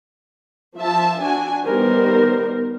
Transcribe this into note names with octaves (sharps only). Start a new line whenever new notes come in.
F3 E5 A5
D4 F#4 G#5
D#3 G3 B3 A#4 C5